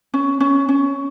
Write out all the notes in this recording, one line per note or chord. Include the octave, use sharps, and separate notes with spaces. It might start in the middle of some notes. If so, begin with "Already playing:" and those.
C#4
C#4
C#4